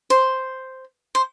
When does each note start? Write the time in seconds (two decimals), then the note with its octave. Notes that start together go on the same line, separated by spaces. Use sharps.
0.10 C5
1.15 C5